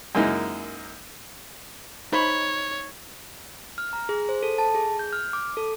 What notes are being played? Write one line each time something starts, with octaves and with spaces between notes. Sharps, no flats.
F#2 G#3 A#3 D#4 E4
D#4 C5 C#5 B5
F6
A#5
G#4
C5
A4
A5
G#4
G6
F6
D6
A4